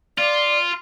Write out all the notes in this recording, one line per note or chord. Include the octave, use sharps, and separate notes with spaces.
F4 D5